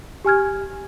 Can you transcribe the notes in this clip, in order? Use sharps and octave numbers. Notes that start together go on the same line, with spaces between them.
G4 G#5 F6 G#6